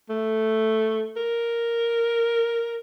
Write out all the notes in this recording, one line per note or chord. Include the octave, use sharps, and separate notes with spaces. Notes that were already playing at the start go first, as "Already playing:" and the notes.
A3
A#4